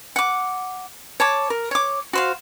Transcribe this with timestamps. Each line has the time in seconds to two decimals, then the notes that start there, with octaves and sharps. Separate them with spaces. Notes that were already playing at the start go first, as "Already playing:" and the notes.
0.16 F#5 D6
1.20 C#5 A5 D6
1.50 A#4
1.71 C#5 D6
2.13 F#4 C5 F5